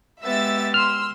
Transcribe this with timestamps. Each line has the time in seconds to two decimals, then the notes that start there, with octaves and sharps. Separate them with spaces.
0.22 G#3 B3 G4 E5 E6 A6
0.74 C6 E6 F6